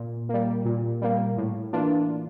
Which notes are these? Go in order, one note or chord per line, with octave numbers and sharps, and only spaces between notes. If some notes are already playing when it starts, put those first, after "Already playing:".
Already playing: A#2
G3 A#3
A#2
G3 A#3
A2
E3 A#3 D4 F4